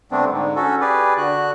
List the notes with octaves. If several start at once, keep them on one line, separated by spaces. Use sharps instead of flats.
C3 G3 A3 B3 C4 D4
G#2 D3
C#4 F#4 A4
G4 G#4 B4 D5
D3 F#4 F#6